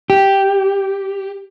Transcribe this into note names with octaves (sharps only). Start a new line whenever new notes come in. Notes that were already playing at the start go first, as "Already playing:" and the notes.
G4